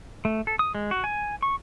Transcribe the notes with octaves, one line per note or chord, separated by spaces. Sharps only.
A3
A4
D#6
G#3
F#4
G#5
C#6